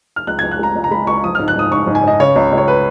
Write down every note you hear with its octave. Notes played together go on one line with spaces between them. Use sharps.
F6
C#2 F#6
C#2 G#6
F#6
G#3 A#5
C#2
A#5
G#3 B5
C#2 C#6
F3 D#6
G#2 F6
F#6
G#2 D#6
G#2 C#6
G#2
G#5
G#2 D#5
C#3 C#5
C#2
C#2
C#5
B4